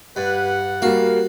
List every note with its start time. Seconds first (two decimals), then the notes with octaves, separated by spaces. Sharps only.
0.16 G2 B4 F#5
0.82 G3 A#3 F#4 F5